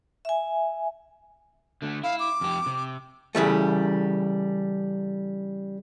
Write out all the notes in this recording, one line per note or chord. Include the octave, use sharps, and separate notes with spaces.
E5 G#5
D3 A3
E4 F5
D6
F2 G4
C3
C#3 E3 G3 A3